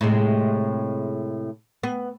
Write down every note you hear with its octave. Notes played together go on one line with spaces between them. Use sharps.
A2 C3 G#3
B3